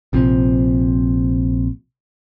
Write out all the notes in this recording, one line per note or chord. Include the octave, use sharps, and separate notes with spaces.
A#1 C3 F3